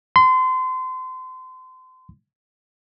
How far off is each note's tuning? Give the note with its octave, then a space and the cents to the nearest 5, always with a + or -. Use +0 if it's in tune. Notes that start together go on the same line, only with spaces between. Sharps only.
C6 -30